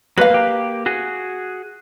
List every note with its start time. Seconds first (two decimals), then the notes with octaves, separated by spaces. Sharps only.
0.18 F#3 G#3 A#3 B4 F5
0.30 A#3 G4
0.86 F#4 G#4